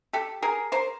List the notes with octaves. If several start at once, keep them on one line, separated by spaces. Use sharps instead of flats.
G4 A4
G#4 A#4
A#4 C5